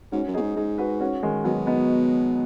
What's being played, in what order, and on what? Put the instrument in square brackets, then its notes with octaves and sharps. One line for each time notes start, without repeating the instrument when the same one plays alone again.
[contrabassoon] G#2 [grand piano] C#4 F#4
[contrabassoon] F#2
[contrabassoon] B2 [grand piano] D#4 G#4
[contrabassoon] G#2
[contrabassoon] G#2 [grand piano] D#4 G#4
[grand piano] F#4 B4
C#4 F#4
D#3 G#3
[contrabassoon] B2 [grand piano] F#3 B3
[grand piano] B3 D#4